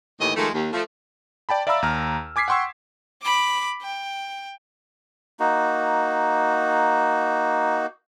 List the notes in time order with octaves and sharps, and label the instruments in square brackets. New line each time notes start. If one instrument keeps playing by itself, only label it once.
[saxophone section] D#2 A2 E3 G4 D#5
D#3 F3 G#3 A3
D#2
F3 A3
[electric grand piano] D5 G5 A5 B5
D5 E5 F5 A#5 B5 E6
D#2 A#5 F6
G#5 D6 G#6 B6 C7
F#5 G5 C6 C#6 E6
[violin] B5 D6
G5
[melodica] A#3 D#4 F#4